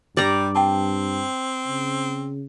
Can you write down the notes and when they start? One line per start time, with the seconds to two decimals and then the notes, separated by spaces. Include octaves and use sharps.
0.17 G2 G3 D5 A#5
0.55 C4 G5 A5
1.68 C#3